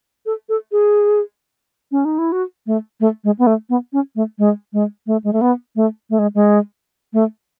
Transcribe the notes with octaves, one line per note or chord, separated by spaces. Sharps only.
A4
A4
G#4
C#4
D#4
E4
F#4
A3
A3
G#3
B3
A3
B3
C#4
A3
G#3
G#3
A3
G#3
A3
B3
A3
A3
G#3
G#3
A3